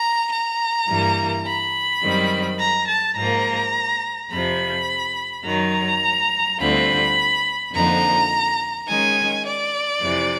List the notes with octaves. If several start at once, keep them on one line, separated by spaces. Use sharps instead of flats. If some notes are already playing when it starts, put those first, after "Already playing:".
Already playing: A#5
A#5
G2 E3 G3 A#3
B5
F#2 D#3 G3 C4
A#5
A5
G#2 F3 A#3 A#5
F2 C3 F3 B5
F#2 D#3 F#3 A#5
D2 D3 G3 C4 F4 B5
F2 D3 F3 A#3 D#4 A#5
D#3 G#3 C#4 G#5
D5
F2 C3 E3